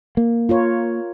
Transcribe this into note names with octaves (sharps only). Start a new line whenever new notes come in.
A#3
F4 A#4 C#5